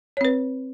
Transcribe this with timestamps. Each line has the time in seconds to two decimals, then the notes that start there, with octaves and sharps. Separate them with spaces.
0.17 C#5
0.21 C4
0.25 B4